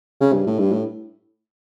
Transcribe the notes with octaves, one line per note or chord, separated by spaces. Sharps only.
C#3
G2
A2
G2
A2